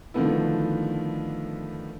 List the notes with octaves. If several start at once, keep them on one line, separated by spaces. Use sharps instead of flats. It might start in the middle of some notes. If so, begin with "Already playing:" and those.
D3 D#3 F3 A3 B3 E4